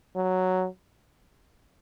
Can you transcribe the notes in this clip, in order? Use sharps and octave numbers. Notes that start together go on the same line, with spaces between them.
F#3